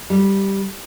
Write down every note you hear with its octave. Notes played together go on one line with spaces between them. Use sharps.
G3